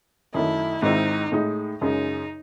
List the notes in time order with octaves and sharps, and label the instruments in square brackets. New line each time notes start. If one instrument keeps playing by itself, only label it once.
[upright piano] F#2 D#3 A3 [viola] E4
[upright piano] G#2 D#3 G#3 C4 E4 [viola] D#4
[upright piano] A2 G#3 D#4
[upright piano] F#2 C#3 G#3 [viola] D#4